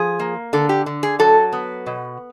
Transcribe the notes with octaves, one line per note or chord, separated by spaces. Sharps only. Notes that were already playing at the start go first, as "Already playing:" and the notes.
Already playing: F3 G#4
A#3
D3 A4
G4
D3
G#4
F#3 A4
B3
B2